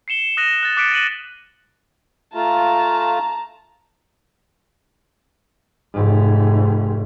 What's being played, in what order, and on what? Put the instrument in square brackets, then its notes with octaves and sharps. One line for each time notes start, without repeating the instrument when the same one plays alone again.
[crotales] C7 C#7 E7 G7
D#6 F#6 A#6 D#7 E7
F#6 A6
D6 F#6 A6 B6 C#7 D7
A6 D#7 F#7
[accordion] A3 F4 [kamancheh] A5 A#5
[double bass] F1 G#2